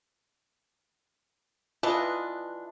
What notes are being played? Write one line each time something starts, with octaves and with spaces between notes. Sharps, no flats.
E3 A3 D4 F4 B4 D#5